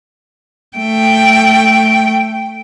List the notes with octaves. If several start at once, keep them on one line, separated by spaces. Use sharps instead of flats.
A3 G5